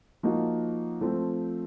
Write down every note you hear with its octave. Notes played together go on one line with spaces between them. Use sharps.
F3 A#3 D#4 F#4
F3 A3 C4